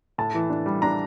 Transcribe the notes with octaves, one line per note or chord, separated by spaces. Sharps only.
A2 A5
E3
D4
G3
D4 A#5